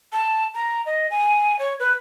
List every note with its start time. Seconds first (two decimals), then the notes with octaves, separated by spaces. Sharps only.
0.13 A5
0.54 A#5
0.86 D#5
1.11 G#5
1.59 C#5
1.80 B4